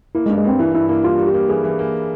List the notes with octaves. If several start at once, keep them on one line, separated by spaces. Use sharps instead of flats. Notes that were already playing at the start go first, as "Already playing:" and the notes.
A#3 E4
G#3
G2
G#3
G2 C4
E3 E4
G2 E4
A#3 E4
G3 F4
G3
G4
A#3
E3 G#4
E3
A#3